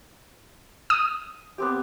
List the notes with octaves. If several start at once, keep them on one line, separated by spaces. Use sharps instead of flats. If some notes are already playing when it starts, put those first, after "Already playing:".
D#6
B3 C4 G4